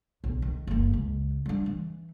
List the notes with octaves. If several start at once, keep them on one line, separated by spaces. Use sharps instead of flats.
B1
D#3
F#1 A#3
C#2
G3 D4
E3